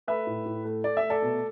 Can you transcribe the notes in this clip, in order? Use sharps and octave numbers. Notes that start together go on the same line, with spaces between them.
A3 B4 E5
A2
A2
A3
A3 D5
E5
A3
A4 D5
B2